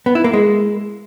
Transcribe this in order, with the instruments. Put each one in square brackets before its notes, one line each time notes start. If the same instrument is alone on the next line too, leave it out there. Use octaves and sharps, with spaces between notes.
[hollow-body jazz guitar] B3
E4
A#3
G#3